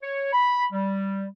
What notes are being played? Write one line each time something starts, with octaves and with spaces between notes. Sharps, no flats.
C#5
B5
G3